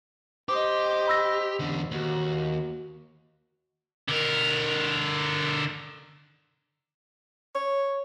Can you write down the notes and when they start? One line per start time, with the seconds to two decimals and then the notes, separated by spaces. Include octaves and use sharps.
0.49 G4 C5 D#5 D6 D#6
1.08 B5 E6 A#6
1.60 E2 D3
1.91 D#2 F#4
4.08 D3 A#4
7.55 C#5